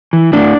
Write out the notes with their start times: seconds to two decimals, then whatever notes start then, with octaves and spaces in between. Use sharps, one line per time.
0.13 E3
0.33 A2 D4